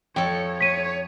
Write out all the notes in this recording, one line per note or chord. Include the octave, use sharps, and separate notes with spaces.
F2 A4 C#5 G5
C#5 B6 D#7